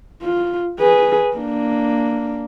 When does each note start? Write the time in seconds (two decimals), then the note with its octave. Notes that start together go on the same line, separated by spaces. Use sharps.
0.22 F4
0.80 G#4 B4
1.37 A#3 D4